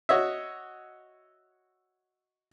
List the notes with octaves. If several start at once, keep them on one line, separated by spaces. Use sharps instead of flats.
F#4 C#5 D#5 E5